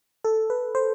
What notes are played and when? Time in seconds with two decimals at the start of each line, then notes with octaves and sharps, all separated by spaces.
0.25 A4
0.50 B4
0.75 C5